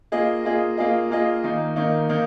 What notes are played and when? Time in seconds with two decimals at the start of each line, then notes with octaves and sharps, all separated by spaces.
0.12 A#3 F4 G#4 D#5
0.45 A#3 F4 G#4 D#5
0.77 A#3 F4 G#4 D#5
1.10 A#3 F4 G#4 D#5
1.44 D#3 A#3 D#4
1.76 D#3 A#3 D#4
2.09 D#3 A#3 D#4